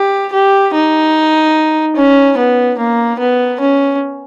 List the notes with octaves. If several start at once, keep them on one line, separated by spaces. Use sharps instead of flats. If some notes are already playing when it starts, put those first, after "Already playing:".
Already playing: G4
G4
D#4
C#4
B3
A#3
B3
C#4